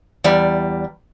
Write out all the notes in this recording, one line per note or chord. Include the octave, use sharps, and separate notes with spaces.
E2 G3 D5